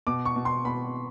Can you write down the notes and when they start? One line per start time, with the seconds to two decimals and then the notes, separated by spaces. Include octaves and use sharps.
0.07 B2 D6
0.25 C#6
0.36 B2
0.45 C6
0.65 B2 B5